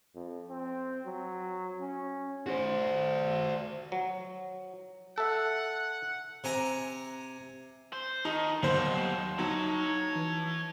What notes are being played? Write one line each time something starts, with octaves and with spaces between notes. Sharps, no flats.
F2
C4
F#3
C#4
F#4 C5
F#3
A4 E5 F#5
C3 G#5 A#5
C5
D#3 D#4 A5
D#2 B2 F#3 G3 C5
F#3 D#4 C#5 A5
E3